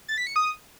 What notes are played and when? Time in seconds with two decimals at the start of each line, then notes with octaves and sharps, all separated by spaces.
0.08 A6
0.18 B6
0.27 C#7
0.36 D#6